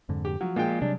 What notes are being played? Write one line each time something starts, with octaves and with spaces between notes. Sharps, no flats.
F2 G#2 D3
G4
F3 F#3
G#3 A#3 F4 G5
C3 F#3 G3 D4